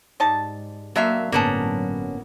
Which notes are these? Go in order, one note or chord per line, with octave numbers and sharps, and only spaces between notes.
G#2 G3 D#4 A5
D3 F#3 A#3 E5 F5
G1 A2 F#3 A#3 B3 C#4 A5